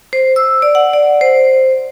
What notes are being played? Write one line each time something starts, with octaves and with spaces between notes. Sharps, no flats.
C5
E6
D5
F#5
D5
C5